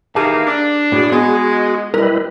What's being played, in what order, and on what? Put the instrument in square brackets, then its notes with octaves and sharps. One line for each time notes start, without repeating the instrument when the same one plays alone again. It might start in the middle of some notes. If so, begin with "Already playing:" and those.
[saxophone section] D#3 E3 A#3 [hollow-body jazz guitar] G4 G#4 A5
[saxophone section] D4
[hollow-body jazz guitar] A2 [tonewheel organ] F#4 G#4
[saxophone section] G#3 [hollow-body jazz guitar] B3
[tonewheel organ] G3 E4 B4 [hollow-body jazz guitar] A#4 D#5